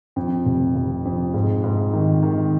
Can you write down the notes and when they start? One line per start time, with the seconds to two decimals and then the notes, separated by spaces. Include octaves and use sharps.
0.16 F2
0.46 F1
0.76 F1
1.05 F2
1.34 G#2
1.64 G#2
1.93 D#3
2.23 D#3